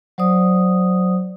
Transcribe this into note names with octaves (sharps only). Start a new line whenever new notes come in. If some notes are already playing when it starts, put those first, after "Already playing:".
F#3 C5 D5 D#6